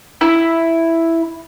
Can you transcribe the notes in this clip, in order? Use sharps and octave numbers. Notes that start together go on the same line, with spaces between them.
E4